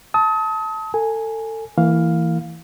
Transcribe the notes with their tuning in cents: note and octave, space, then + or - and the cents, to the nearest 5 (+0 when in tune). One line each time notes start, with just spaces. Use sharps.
A5 +0 D#6 +40
A4 +25 G#5 +0
E3 +0 A#3 -35 F5 +5